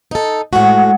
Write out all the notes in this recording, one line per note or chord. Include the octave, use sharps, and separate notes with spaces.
D#4 A4
A2 G#3 F#4 F#5